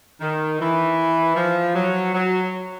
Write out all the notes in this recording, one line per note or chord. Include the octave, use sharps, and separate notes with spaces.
D#3
E3
F3
F#3
F#3